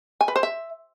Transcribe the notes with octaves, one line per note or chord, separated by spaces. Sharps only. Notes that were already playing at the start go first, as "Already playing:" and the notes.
G#5
B4
C5
E5